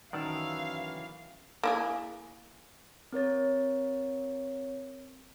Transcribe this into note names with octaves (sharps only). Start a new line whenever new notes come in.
F#2 D#3 E3 D5 F5 F#5 A5 E6
A#3 E4 G#4
C4 A#4 C#5 A6